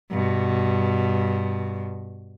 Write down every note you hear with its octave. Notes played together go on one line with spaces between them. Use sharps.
G2 B2